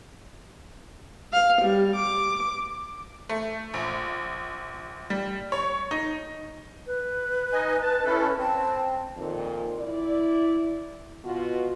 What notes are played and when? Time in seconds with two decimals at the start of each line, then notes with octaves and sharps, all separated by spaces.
1.33 F5
1.61 G3
1.96 D6
3.29 A3
3.74 A#1
5.10 G3
5.52 C#5
5.91 D#4
6.87 B4
7.53 D#4 D#5 G#5
7.82 A5
8.05 C#4 E4 A4
8.38 C4 A5
9.17 F2 A#2 D#3
9.79 E4 D5
11.25 B2 F4 F#4